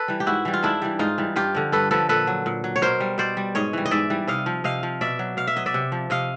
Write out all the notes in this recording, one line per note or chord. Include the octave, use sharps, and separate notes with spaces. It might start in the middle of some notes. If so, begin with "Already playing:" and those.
Already playing: A4 B4
E3 G3
G4
G#2 E4 F#4
E3 G3
F4
G#2 D4 E4
E3 G3
G#2 D#4 F4
E3 G3
G2 F4 G4
D3 F3
G2 A4 B4
D3 F3 A4 B4
A#2 A4 B4
F#3
A#2
F#3
C#5
B2 A#4 C5
G3
B2 C5 D5
G3
G#2 C#5 D#5
E3 G3
D#5
G#2 D5 E5
E3 G3
C3 D#5 F5
F3
C3 D#5 F5
F3
B2 D5 E5
F#3
B2 F5
E5
F#3 D#5
D5 E5
C3
F3
C3 D#5 F5